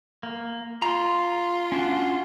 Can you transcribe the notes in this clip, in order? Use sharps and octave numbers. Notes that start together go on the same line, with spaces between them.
A#3
F4 A#5 C6
C#4 D4 F#4